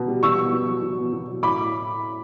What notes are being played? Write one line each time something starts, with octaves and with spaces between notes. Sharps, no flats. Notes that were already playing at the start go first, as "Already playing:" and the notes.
Already playing: B2
G3
B2 C#6 E6
B3
B2
F#3
B2
B3
B2
F#3
A2 B5 D6